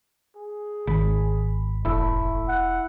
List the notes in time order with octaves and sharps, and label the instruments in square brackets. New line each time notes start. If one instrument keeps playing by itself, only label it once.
[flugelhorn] G#4
[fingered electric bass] G#1 [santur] B5
[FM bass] E1 [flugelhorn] A3 [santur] E4
[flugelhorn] F#5